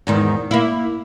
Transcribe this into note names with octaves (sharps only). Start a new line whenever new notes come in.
E2 G#2 D#3
A#3 E4